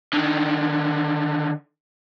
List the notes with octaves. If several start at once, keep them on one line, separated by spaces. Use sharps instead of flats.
D3 D#3